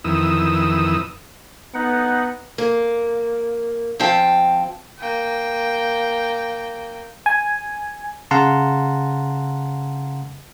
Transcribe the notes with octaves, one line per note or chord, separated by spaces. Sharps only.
F2 D#3 E3 D#6 E6
B3 D#4 F#5
A#3
F3 C4 F5 G5 A5
A#3 G5
G#5
C#3 F5 F#5 A5 A#5 C6